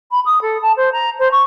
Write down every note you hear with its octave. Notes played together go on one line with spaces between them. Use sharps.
B5
D#6
A4
A5
C5
A#5
C5
C#6